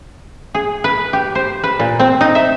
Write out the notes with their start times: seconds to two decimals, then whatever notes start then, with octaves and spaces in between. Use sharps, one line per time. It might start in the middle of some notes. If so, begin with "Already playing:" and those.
0.54 G#4
0.84 B4
1.13 G4
1.35 C5
1.64 B4
1.80 A#2
1.99 C4
2.21 D#4
2.35 E5